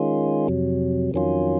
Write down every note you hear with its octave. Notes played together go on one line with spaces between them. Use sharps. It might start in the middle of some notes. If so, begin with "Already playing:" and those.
Already playing: D#3 G#3 C#4 F4
F2 C3 F#3
F2 D#3 F#3 C#4 F4